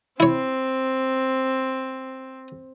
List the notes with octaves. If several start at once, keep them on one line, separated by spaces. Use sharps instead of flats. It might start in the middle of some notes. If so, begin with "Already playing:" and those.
C4 E4 C#5